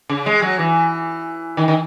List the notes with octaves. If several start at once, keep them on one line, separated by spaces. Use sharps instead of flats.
C#3
G#3
F#3
E3
D#3
D#3